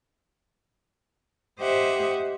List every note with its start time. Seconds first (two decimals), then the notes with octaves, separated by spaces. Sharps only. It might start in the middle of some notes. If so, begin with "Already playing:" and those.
1.60 G4 C5 D#5 E5 F#5